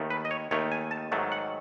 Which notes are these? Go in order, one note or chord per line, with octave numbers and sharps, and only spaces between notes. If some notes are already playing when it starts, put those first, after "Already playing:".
Already playing: D#2 D#3 A3
B4
D#5
C#5
D#2 D#3 A3 C#5
G#5
A5
G#2 D#3 F#3 A3 A5
F#5